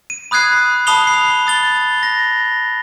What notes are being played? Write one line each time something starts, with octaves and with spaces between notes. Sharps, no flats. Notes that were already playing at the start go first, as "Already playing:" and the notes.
D#7
B5 D#6 F#6 G#6 C7
A5 B5 D#6 C7 F7 G7
C7
D#6 A6 G7
A#6